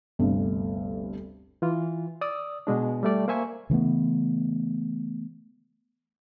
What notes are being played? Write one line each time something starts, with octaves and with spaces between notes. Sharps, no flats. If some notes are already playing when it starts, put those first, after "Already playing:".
G1 D2 G2 C3
E3 F4
D5 D#6 E6
B2 G#3 D4
G3 A3 D5
A#3 C5 E5 G#5 C#6
C#3 E3 A3 B3